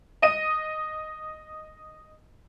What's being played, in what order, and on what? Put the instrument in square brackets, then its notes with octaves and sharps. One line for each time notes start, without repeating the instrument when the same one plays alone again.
[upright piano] D#5 D#7